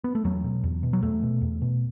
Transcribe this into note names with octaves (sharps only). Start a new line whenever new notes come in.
B3
A3
E2 F#3
B2
E2
B2
F#3
E2 A3
B2
E2
B2